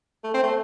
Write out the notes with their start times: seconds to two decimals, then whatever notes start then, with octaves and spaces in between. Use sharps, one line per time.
0.24 A3
0.34 C4
0.43 A3